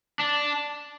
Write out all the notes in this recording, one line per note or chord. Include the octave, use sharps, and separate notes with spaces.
D4